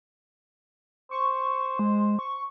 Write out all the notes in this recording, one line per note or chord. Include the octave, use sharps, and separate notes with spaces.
C5 C#6
G#3
C#6